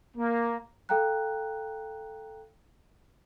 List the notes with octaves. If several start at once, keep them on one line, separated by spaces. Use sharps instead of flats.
A#3
A4 F5 G5 A#5 F#6